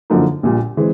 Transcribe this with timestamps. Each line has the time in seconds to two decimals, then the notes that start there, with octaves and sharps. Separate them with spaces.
0.10 F#2 D3 F3 A#3 D#4
0.43 A#1 A#2 G3
0.77 E3 G#3 C4